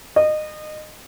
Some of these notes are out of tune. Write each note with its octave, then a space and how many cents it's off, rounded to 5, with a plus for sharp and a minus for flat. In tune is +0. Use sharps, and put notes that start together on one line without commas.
D#5 -25